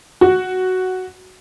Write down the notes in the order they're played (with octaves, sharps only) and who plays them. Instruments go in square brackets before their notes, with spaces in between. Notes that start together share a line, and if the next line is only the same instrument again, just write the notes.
[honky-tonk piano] F#4